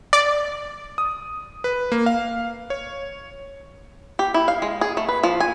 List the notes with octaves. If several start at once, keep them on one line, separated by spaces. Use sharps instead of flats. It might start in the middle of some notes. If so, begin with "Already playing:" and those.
D5
D#6
B4
A#3
F5
C#5
G4
E4
F5
G#3
G#4
A3
B4
F3
G#5